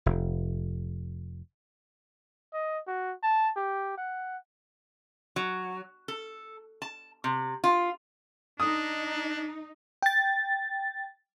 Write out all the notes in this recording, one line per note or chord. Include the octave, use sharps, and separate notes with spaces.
F1
D#5
F#4
A5
G4
F#5
F#3
A4
A5
C3
F4
D4 D#4 D#6
G5 A6